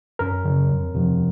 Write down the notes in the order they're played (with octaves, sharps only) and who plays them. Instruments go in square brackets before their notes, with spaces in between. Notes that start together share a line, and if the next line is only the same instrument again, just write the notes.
[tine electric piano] F#2 A#4
C#3 F#3
F2
C3 F3